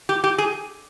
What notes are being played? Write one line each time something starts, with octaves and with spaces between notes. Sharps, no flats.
G4
G4
G#4